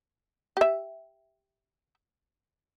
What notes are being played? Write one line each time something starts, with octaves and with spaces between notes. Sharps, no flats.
G4 E5